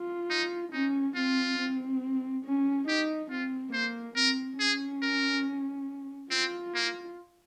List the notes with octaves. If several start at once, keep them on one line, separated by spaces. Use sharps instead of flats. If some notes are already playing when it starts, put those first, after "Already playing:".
Already playing: F4
D#4
C#4 D#4
C4 F4
C4
C#4
D#4 G4
C4 F4
A#3 C5
C4 A#4
C#4 G#4
A#4
C4 F4
A#3